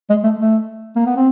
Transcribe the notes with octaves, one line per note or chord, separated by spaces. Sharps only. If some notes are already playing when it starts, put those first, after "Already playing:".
G#3
A3
A3
A#3
B3
C4